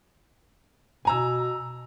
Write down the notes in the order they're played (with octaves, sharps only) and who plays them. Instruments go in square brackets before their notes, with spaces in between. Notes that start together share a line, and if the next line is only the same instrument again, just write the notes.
[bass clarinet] B2 [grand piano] G#5 A#5 E6